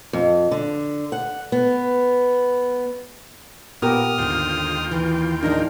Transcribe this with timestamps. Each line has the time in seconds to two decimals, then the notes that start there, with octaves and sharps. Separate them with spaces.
0.13 F2
0.51 D3
1.12 F#5
1.52 B3
3.82 A#2 B3 G4 A#4 D#6 F6
4.18 D#2 G#2 D3 F4 G5
4.91 E3
5.43 A2 F3 G#3 D4 D#4 A#4